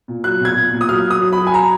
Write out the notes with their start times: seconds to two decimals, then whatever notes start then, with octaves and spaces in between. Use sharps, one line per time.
0.08 A#2
0.24 F#3 F#6
0.41 A#2 G#6
0.56 A#2
0.73 A#2
0.81 D#6
0.89 F#3 F6
1.05 F#3
1.10 D#6
1.22 F#3
1.33 B5
1.38 F#3
1.47 G#5
1.54 A#5